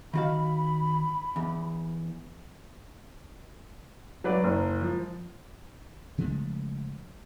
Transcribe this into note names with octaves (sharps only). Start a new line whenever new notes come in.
D#3 F#4 F5 B5
E2
F#3 B4 D5
F#1
F3
C#3 F3 G#3 A3